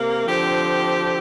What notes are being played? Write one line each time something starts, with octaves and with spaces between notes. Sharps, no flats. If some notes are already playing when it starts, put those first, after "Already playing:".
Already playing: C3 A#3
D3 F3 C4 G4